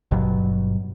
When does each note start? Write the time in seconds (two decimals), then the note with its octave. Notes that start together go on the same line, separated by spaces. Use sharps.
0.11 G#1 G2 B2 F#3